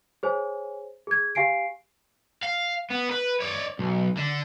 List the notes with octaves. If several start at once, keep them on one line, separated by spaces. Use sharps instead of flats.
G#4 C5 C#5 G#5
G#4 G#6
G4 F5 G#5 C7 D7
F5
B3
B4
C#5 D5
B1
D3